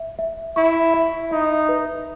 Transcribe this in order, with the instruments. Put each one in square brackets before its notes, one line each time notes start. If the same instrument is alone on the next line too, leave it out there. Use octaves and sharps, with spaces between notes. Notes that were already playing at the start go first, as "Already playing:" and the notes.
Already playing: [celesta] E5
E5
[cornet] E4 [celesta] C#6
[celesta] E5
[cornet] D#4 [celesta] E5
[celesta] B4